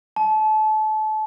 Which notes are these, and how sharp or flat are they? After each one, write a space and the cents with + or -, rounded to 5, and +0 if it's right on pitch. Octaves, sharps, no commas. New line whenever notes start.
A5 -30